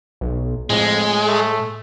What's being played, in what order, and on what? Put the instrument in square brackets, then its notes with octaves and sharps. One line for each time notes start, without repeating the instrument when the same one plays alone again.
[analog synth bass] B1
[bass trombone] F2 [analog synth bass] A2 [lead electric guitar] G#3
[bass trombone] A3